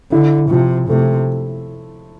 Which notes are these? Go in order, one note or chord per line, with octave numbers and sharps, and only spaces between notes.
D3 E4
C3 F3
C3 A3